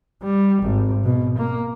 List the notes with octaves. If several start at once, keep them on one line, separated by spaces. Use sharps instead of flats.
G3
G#1
B2
A#3